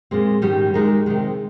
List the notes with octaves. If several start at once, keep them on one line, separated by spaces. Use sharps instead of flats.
A#2 G#3 C4
G#2 D#3 G3 C#4 G4
A#2 G#3 D#4 A#4
C3 D#3 G#3